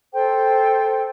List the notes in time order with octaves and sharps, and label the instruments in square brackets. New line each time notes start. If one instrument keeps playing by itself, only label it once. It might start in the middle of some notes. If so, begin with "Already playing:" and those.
[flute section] A4 C5 G5